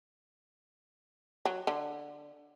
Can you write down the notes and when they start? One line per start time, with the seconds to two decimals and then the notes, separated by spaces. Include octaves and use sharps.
1.45 F#3
1.67 D3